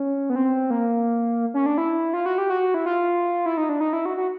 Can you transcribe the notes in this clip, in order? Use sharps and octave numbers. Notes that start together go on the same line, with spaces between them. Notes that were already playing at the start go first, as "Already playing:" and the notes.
Already playing: C#4
B3
C4
A#3
C#4
D4
E4
F4
F#4
G4
F#4
E4
F4
E4
D#4
D4
D#4
E4
F#4
F#4